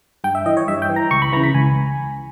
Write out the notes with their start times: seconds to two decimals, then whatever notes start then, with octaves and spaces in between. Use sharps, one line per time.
0.24 G2 G5
0.35 E5
0.46 E3 D#5
0.57 C#5
0.68 G2 E5
0.82 G5
0.89 E3
0.96 A#5
1.11 C#2 C#6
1.22 B5
1.33 C#3 E3 A#5
1.44 B5
1.54 C#2 G#5